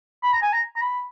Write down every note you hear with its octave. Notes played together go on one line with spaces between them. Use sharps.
B5
A#5
G#5
A#5
A#5
B5